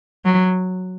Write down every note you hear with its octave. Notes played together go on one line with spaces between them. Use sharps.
F#3